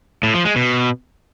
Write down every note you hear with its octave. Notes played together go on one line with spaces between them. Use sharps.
A2
F3
G#3
B2